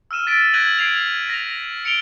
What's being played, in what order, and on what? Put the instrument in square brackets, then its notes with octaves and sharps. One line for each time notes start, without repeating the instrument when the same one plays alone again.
[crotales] E6 F6 D#7 E7
A6 B6 D7 E7
F#6 G#6 A#6 D7 D#7 F#7
G#6 C7 D7 F7
A#6 F7
C#7 D7 F7 G7